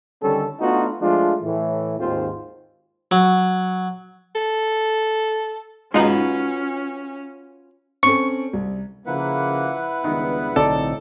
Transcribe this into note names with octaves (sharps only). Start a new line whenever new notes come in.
D3 D#3 G3 C#4 A4
A3 B3 D4 D#4 F4 F#4
F3 G#3 A3 D4 F4
A2 E3
G#1 D#2 G#2 C4 F4 C5
F#3
A4
G#3 C#4 D#4 F4 F#4 B4
C4 C#4 A4 C#6
C2
C#3 F3 A#3 E4 B4 F#5
C#2 G2 D#3 B3
B1 A2 D3 C4 D#4 A4 D5